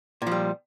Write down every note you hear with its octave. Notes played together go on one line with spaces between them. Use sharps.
A#2 F3 G3